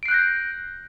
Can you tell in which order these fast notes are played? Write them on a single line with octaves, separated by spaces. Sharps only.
D7 C7 F#6 G6 A#6